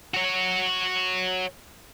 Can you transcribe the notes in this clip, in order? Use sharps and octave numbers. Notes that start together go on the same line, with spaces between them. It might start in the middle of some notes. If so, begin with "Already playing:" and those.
F#4 C#5